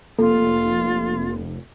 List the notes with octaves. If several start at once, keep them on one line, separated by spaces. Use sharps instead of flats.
F1 A#3 F4 A4